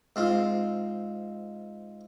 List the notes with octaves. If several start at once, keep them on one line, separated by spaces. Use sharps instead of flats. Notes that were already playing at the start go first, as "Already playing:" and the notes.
G#2 C4 F4